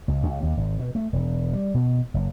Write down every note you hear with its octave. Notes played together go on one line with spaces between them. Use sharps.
C#2
C#2
D#2
G#1
B2
A3
E1
G3
B2
F#1